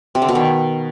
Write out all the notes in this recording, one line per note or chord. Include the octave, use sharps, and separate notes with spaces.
C3
D3
B2
D#3